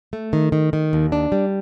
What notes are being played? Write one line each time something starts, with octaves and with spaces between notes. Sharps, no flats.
A3
D#3
D#3
D#3
D#2
D4
G3